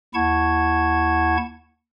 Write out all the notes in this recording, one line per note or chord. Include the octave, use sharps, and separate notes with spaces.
D#2 E4 F#5 A5 C#6 G#6